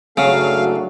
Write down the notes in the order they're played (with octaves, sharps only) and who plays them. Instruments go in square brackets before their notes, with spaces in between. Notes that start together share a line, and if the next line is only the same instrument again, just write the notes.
[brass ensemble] F#1 A3 D4 [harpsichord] C#3 [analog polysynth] F#3 [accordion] F5